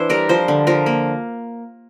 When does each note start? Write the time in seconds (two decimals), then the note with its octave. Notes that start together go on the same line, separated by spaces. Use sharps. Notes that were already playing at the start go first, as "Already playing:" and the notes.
Already playing: E3 D4 E4 C5
0.10 G3 A#4
0.29 F3 C5
0.48 D3
0.67 F3 A#4
0.86 A#3